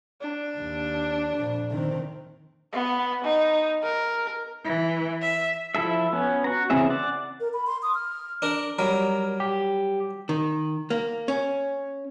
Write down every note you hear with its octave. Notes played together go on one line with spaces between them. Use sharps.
D4
D#2
F2 A#2
D#3 C4
B3
D#4
A#4
E3
E5
F3 E4 A4 E5
B3 C#4
F#4 A#5
C#3 E3 C4 G#4 E5
D5 F#5
A#4
B5
C6
D#6
F6
D4 A#4
F#3 G3 A#4
G4
D#3
A#3
C#4